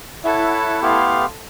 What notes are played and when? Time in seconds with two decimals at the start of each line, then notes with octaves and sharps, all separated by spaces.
0.25 E4 A4 C#5 E5 F#5
0.82 A3 B3 G4 F5 C6